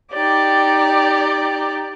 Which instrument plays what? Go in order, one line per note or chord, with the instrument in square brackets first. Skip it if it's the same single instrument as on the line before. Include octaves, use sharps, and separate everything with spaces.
[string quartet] D#4 G4 D5